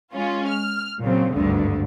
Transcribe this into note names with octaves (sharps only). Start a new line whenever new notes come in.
G#3 C#4 F4
F6
A#2 C#3 F#3 C4
G#1 D2 G2 D3